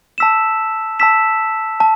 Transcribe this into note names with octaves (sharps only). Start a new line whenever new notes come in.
A5 E6 B6 E7
A5 E6 B6 E7
A5